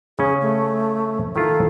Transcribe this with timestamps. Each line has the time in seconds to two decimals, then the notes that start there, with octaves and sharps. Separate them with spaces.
0.19 C#3 C#4 G#4
0.42 A3
1.36 D#3 E4 F4 A4